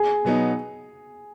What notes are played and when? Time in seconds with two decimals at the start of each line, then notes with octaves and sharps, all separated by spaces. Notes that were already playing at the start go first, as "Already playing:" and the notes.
Already playing: G#4
0.25 B2 F#3 B3 D#4